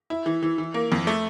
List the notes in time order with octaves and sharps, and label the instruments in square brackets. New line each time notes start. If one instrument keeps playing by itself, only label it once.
[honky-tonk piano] E4
E3
E3
E3
A#3
F2
A3